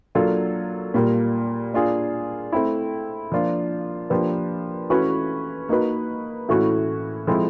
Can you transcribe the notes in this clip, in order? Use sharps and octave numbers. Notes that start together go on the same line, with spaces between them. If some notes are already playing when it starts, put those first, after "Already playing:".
F#3 A#3 D4 F4 A4
A#2 G3 A#3
A#3 D4 F4 G#4
A3 C4 E4
F3 A#3 D4 F4
F3 A#3 D4 G4 B4
E3 A3 C#4 F#4 B4
A#3 D#4 F#4 B4
A2 E3 A3 C#4 F#4
F3 G#3 C4 E4 A4